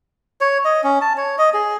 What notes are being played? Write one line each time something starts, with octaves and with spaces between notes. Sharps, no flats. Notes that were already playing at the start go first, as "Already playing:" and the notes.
C#5
D#5
C#4
A5
C#5
D#5
G#4